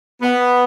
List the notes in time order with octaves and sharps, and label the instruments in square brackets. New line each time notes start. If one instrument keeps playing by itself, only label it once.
[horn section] B3